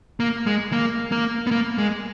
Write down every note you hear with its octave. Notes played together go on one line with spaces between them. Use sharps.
A#3
G#3
A#3
A#3
B3
A#3
G#3